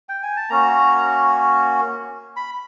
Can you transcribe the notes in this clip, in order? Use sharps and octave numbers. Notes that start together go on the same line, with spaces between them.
G5
G#5
A5
A#3 C#4 F#4 A#5
B5